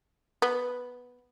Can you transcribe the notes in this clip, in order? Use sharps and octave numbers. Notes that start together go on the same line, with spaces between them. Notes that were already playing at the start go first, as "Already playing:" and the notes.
B3